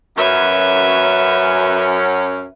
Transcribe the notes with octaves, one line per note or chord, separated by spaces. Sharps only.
F#2 C#4 B4 E5